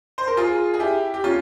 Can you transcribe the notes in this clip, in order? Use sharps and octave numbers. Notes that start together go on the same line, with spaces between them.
C5
A#4
F4 G#4
G#4
E4 G4
G4
C#4 F4